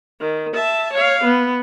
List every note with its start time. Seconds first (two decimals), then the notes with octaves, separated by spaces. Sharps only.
0.21 D#3
0.54 E5 A5
0.93 C#5 F5
1.24 B3